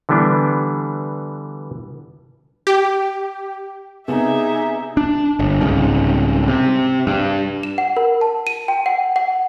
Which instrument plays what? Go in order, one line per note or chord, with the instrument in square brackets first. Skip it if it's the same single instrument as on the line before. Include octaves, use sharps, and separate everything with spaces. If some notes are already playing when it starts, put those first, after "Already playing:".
[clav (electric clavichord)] D3 E3 G3 B3 D4
[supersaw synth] G4
[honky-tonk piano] C3 B3 [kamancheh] D#4 [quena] G#4 [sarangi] E5
[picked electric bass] D4
G1
C2 G#2 C#3
C3
G2
[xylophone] E7
F#5
A#4
A5
D#7
G5
F#5
F#5